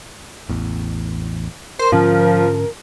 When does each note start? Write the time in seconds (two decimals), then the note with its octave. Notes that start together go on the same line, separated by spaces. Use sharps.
0.49 A1 E2
1.79 A#4 C5
1.92 G#2 D3 F3 C#4